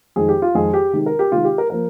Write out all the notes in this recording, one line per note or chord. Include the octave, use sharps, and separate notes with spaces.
F2 D#3 G#3 G#4
G4
F4
F2 D#3 G#3 G#4
G4
C3 D#3 G#3
A#4
G4
C3 D#3 G#3 F4
G4
A#4
F3 A#3 A#4